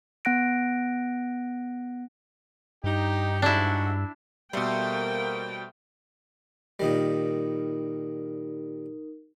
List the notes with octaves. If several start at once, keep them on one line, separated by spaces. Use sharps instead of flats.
B3 F#5 F#6 A#6 D7
G2 D#4 G4
G#2 D4 E4 F#4
B2 G3 A3 A#3 A#4 C5 G5
A#2 D#3 G3 D#4 A#4